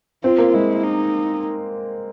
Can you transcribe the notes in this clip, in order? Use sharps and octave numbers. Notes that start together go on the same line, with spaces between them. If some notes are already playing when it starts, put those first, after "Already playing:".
C4 F4
A#3
G#3 E4
D#4